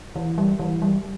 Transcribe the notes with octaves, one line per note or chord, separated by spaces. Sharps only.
E3
G3
E3
G3